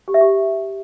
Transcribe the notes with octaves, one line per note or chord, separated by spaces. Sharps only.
G4
E5
G4